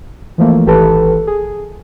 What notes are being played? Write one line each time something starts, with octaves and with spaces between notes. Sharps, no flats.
E3 F3 A3 A#3
G#1 E3 G4 A4 B4 A5
G#4